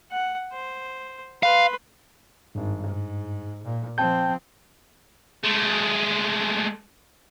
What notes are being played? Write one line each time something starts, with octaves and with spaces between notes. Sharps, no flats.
F#5
C5
B4 F5 C6
G#1 G2
G#2
A#2
F3 C4 G5 A5 G6
G#3 A3